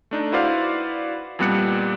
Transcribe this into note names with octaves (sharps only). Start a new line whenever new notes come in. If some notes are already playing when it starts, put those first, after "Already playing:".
A3 D4 D#4
E4 F#4 B4 C5 D5 F5
F2 A#2 G3 B3 F#6 C#7